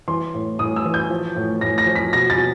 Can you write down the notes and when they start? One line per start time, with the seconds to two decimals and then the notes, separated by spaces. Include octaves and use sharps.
0.08 E3 C6
0.34 A2
0.59 A2 D#6
0.76 E6
0.85 E3
0.94 G6
1.10 F3
1.36 A2
1.61 A2 A#6
1.78 A#6
1.86 F3
1.96 B6
2.13 B2 A#6
2.30 A6
2.38 B2